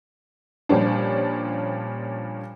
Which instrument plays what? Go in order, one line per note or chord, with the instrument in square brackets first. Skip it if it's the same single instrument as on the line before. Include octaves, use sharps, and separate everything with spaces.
[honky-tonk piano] A#2 F3 G3 C#4 D4